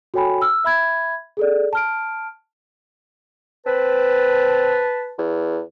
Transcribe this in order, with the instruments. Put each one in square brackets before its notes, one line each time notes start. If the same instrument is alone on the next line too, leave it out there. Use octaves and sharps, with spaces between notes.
[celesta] F#4 A4 C#5 G5 G#5 B5
E6 F6
E5 B5 G#6
G#4 A4 D5
A5 F6 D7
[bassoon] C4 [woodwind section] B4 A5
[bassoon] E2